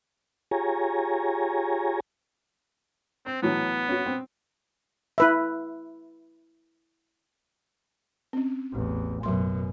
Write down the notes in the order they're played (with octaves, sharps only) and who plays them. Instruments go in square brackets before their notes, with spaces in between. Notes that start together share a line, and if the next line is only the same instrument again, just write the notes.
[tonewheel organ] F4 G4 G#4 C#5 G#5 A#5
[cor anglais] C4 [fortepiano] C5
[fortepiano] A2 E3 F#3 [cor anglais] B3
[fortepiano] C#4 F#4
C4
[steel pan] E4 B4 E5
[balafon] C4 C#4
[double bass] A1 E2
[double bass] F#2 B2 [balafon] F#3 C6